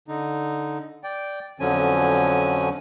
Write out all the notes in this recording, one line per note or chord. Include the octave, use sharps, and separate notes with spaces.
D3 D#4
D5 G5
F2 D3 F3 F#3 C#4 G#5